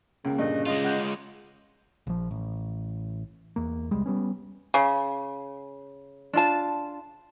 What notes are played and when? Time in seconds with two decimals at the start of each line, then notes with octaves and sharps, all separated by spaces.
0.25 C#2 C#3 A#3
0.38 G2 A#2 D3 D#5
0.66 G#3 F4 D#5
0.85 F#5 F#6 G6
2.07 A#1 F3
2.31 A1
3.56 E2 A#3
3.91 C2 G3 G#3
4.06 G3 B3 C#4
4.74 C#3
6.33 D4 F4 A5